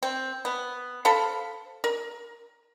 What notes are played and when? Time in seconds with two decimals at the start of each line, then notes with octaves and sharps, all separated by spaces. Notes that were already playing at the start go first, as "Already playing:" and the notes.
0.03 C4
0.45 B3
1.05 A4 C5 F5 B5
1.84 A#4